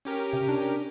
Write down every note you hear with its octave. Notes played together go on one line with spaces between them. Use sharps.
C#4 G4 A#4
C3
D4